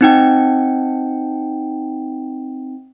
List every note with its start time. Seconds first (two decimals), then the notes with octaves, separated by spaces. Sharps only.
0.01 C4 D#4 G5